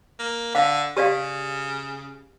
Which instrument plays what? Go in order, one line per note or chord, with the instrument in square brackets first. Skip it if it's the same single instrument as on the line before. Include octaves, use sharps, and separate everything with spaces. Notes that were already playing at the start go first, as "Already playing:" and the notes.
[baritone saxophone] A#3
[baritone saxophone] D3 [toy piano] F5
[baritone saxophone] C#3 [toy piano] G4 D5 F5